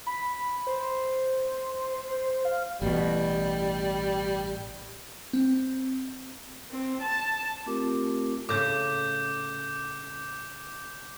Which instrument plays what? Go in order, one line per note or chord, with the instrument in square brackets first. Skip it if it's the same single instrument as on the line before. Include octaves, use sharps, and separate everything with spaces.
[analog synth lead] B5
C5
F5
[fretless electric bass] A1 B2 [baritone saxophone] G3
[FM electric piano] C4
[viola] C4
A5
[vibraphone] A3 C4 F4 G4 A#4 D6
[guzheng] A2 C#3 [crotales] D6 G6